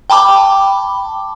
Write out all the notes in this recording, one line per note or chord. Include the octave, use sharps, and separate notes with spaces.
G5 A5 B5 D6